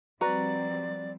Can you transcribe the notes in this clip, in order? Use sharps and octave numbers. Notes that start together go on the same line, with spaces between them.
F3 G3 C4 F#4 B4 D5 A#5